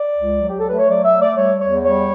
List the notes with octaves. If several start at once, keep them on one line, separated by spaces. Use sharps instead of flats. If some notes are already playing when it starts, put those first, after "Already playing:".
Already playing: D5
C#2
F#3
G4
A4
A3 B4
C#5
F#3 D5
E5
A3
D5
G3 C#5
E2 C#5
G3 C#5